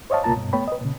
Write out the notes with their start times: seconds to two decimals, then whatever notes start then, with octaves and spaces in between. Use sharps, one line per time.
0.10 C5 C#5 D#5 F5 A5
0.23 C#2 B2 A#3 F4 A5 A#5
0.36 G2 B2
0.53 A3 B3 C#5 G5 B5
0.68 B4 D#5
0.81 A#2 C#3